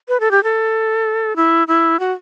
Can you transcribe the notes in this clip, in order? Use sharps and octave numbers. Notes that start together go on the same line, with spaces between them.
B4
A4
G4
A4
E4
E4
F#4